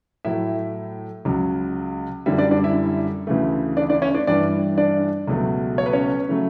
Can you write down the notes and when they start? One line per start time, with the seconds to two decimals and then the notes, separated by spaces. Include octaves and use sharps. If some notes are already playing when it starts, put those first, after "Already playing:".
0.25 A2 F#3 A3 E4 E5
1.25 C#2 C#3 F#3
2.26 F#2 D3 G3 E4 E5
2.38 D4 D5
2.51 D4 D5
2.64 E4 E5
3.27 D2 C#3 E3 A3
3.77 D4 D5
3.89 D4 D5
4.02 C#4 C#5
4.14 D4 D5
4.27 G2 E3 G3 D4 D5
4.78 D4 D5
5.28 C#2 B2 F#3 A3
5.78 C#5
5.86 B4
5.93 C#4 C#5
6.29 C#3 F#3 A3